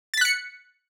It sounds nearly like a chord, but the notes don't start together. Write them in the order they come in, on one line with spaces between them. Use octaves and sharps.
A6 B6 F#6 C#7